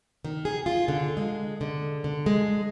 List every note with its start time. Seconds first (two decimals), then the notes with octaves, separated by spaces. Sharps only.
0.25 D#3
0.45 G#4
0.66 F4
0.88 D3
1.17 G#3
1.61 D3
2.04 D3
2.26 G#3